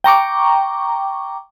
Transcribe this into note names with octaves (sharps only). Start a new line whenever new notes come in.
G5 A#5 C#6 D6